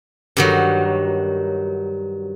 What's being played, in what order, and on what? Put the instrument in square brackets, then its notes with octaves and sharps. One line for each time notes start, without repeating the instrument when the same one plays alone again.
[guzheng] G2 D#3 F#3